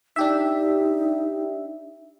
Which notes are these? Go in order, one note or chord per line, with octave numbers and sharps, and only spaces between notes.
D4 D#4 G4 E5